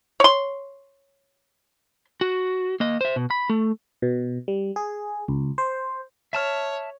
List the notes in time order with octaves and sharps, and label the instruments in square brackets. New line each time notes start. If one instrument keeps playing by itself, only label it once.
[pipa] C#5 C6
[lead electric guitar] F#4
A#3 D#5
C5 E5
B2
B5
A3
[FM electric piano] B2
G3
G#4
C#2
C5
[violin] C#5 [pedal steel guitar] E5 A5 F6